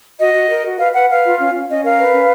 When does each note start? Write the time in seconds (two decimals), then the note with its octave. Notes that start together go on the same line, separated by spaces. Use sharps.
0.19 F#4 D#5
0.34 F#4
0.49 A#4
0.64 F#4
0.78 B4 F5
0.94 B4 F#5
1.08 B4 F5
1.24 F4
1.38 C#4
1.53 C#4
1.69 C#4 D#5
1.83 A#4 F5
1.98 B4
2.14 C#4